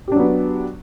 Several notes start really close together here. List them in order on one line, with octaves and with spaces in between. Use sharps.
G4 D4 F#3 B3